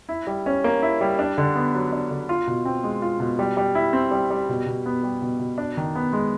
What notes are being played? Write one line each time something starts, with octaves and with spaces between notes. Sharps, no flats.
E4
G3
C#4
A#3
E4
G3
D4
D3
B3
F#3
D4
D3
F4
B2
C4
G#3
F4
B2
G3
G3
E4
C4
G3
G3
B2
B2
B3
G3
B2
B2
D4
D#3
B3
G#3